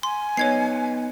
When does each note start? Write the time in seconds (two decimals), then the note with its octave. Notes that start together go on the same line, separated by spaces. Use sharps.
0.03 G#5 C6
0.37 B3 D#4 C#5 G#6 C7